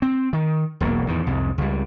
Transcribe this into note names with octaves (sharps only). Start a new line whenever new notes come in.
C4
D#3
E1 B1 F2 A#3
E2 A2 D#3
C2 F2 G#2
C#2 G3